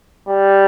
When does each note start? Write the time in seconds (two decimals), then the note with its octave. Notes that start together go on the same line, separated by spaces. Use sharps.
0.28 G3